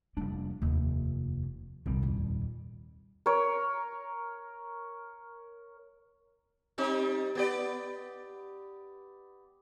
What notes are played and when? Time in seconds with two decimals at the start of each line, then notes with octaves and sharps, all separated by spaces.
0.17 F1 G3 A#3 D4
0.62 F1 D#2
1.86 D#1 C2 G3
2.03 F2
3.26 A#4 C#5
6.78 G3 C4 D#4
7.35 B3 G4 D5